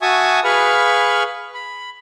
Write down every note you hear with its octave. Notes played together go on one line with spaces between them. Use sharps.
F#4 E5 G#5 A5 C#6 D#6
G#4 B4 F5 B5 C#6 F6
B5